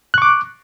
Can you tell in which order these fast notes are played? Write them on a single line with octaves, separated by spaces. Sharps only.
F#6 C#6 D6